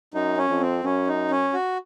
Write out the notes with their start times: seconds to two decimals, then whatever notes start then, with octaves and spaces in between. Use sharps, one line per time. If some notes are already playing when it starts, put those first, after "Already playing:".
0.14 F#2 D#4
0.37 C#4
0.49 F2
0.61 C4
0.84 F#2 C#4
1.07 D#4
1.31 C#4
1.53 F#4